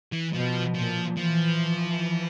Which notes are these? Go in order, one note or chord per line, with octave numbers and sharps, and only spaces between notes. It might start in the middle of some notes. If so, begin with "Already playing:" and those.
E3
B2 F3
A#2 F3
E3 F3